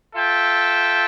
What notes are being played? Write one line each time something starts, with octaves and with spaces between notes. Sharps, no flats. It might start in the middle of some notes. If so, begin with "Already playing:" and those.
F4 A4 E5 G5